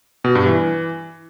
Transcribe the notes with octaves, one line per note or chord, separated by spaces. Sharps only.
B2
G2
E3